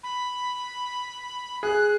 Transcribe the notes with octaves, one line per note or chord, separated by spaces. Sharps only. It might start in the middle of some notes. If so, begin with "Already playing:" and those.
B5
G#4 F#6